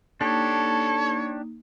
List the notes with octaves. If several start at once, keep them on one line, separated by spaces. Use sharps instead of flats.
A#3 D4 D#4 G4 A4 C#5